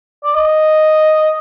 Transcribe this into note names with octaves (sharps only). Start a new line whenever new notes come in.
D5
D#5